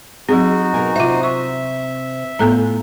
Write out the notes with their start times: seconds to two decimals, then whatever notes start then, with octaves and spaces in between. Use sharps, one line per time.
0.29 F#3 C4 D#4 F#4 G#4
0.74 B2 A#4 G#5
0.96 C3 F4 C5 E5
1.23 E5 C#6
2.39 A2 B3 F4 A4 A#5